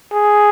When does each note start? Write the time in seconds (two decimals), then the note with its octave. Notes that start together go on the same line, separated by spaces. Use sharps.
0.13 G#4